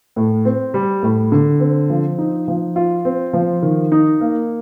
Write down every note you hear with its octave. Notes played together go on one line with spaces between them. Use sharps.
A2
C4
G3
A2
D3
C4
F3
D#4
F3
F4
C4
F3
D#3
D#4
A#3